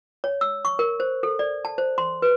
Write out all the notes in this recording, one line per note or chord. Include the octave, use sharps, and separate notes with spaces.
C#5
E6
C#6
A#4
C5
A4
D5
A5
C5
C6
B4